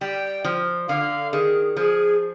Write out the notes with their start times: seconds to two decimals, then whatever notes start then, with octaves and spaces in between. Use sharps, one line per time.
0.01 G3 G5
0.44 F3
0.88 D3 F5
1.32 D#3 G#4
1.76 F3 G#4